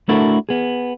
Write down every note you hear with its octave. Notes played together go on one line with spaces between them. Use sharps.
A3 D4 E4 F#4 A4 A#4
B3 G#4